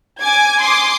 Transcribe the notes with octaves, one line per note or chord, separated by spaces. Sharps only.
G#5 D6 G#6
C6 D6 D#6